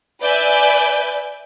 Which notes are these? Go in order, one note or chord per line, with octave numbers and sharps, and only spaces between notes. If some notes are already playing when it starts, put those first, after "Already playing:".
B4 D5 E5 G#5 G6